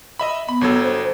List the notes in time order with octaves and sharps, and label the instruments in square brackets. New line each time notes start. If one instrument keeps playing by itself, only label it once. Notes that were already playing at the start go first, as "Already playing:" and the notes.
[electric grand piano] D#5 E5 B5
[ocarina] B3 [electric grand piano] B5
[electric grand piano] G1 F#3 A4
[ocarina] C5